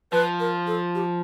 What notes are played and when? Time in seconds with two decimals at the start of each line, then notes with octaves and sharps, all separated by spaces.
0.12 F3 B4
0.40 A#4
0.67 A4
0.95 G4